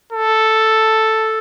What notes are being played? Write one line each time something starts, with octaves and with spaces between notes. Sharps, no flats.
A4